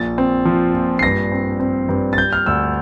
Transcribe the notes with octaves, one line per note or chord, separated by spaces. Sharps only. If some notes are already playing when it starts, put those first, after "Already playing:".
Already playing: A#1 A6
C4
F3
A#1
C7
G2 A#6
C4
C4
G2
A6
G3 G6
F6
D2 E6